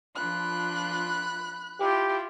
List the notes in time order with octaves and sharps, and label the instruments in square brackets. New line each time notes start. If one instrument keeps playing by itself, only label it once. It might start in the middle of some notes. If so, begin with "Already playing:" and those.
[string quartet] F3 D4 F4 [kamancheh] B5 F#6
[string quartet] E4 F4 [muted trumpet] G4